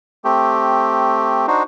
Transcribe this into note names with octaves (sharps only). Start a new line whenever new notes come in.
A3 C4 G4
D4 D#4 F#4 C5